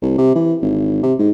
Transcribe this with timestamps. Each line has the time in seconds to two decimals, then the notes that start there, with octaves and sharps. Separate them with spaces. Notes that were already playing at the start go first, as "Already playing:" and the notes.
0.02 C2
0.18 C3
0.35 E3
0.62 G#1
1.03 C3
1.19 G#2